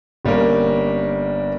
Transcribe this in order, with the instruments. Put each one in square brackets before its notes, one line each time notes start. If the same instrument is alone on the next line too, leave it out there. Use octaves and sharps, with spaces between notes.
[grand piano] G1 G3 A#3 C#4 A#4